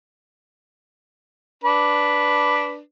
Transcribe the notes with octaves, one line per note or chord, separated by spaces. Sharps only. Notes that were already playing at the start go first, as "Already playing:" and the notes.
D4 B4